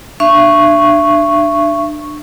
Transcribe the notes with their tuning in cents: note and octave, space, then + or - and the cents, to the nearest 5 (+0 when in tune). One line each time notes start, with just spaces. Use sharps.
D4 +25 E5 +40 C#6 -5